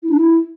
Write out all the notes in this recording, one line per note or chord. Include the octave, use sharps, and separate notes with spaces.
E4
D4
E4